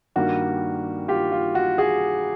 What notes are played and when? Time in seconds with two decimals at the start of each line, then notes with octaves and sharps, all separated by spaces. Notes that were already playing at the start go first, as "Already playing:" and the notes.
0.16 G2 D#3 G3 A#3 F#4
1.08 F4 G4
1.32 F4
1.55 F#4
1.78 F#4 G#4